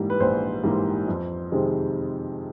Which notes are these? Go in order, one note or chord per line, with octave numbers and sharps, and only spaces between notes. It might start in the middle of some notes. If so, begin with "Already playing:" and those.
Already playing: G#2 E3 G3 A#3
B4
A#1 C5
G#2 E3 G3 A#3
F2
C3 D#3 G#3 C4